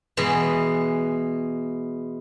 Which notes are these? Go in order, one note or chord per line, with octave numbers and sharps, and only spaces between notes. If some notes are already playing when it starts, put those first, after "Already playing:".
B2 E3 G#3